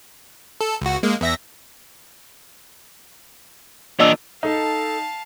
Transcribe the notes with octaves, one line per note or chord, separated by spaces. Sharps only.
A4
C#2 F#4
G#3 A#3
E2 E5 A#6
A#2 E3 D4 D#5 E6
D#4 A4 F5 A5